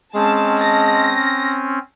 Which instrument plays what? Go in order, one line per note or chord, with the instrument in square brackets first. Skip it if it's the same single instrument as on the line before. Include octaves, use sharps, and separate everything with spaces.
[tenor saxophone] G#3 [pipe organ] C4 C#4 [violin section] A5
[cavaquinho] A5 [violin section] A#6